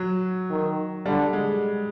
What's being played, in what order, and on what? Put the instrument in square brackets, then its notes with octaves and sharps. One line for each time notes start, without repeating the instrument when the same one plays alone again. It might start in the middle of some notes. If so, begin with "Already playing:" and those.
Already playing: [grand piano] F#3
[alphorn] D#3
[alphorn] D3 [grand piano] G3
[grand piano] G#3